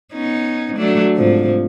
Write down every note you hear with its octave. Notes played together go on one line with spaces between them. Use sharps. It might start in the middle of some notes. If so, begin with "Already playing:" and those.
B3 C#4 D#4
F#3 A3 D4
G#2 C3 F3